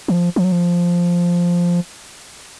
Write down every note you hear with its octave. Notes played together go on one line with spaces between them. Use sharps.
E3
F3
F3
F#3
F3